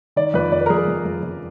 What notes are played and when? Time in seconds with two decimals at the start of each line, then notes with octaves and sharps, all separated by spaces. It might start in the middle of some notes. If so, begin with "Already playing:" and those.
0.16 D#3 D5
0.34 F2 B4
0.52 F2 D5
0.61 B4
0.66 A#4
0.70 F2 G#4
0.78 A#4
0.88 F2
1.05 F2
1.23 F2